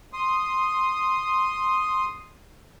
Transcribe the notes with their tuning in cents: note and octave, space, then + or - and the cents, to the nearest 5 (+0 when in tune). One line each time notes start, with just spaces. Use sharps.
C6 +0 D#6 +0